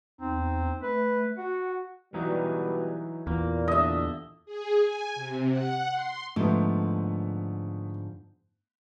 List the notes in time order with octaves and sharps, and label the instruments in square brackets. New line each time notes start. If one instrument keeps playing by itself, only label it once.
[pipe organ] E2 D#4 [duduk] C4
[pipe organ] A3 [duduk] B4
[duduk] F#4 [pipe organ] F#5
[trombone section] B2 G3 [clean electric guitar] E3 F#3 D#4
[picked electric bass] E2 [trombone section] A#2 [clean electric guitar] A#3
[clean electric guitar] D3 [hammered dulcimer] D#5 E5
[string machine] G#4
G#5
C3
F#5
C6
[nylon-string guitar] G#2 D3 F3 [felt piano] A3 B3